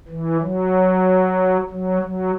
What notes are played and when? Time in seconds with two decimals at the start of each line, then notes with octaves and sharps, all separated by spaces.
0.08 E3
0.41 F#3
1.70 F#3
2.02 F#3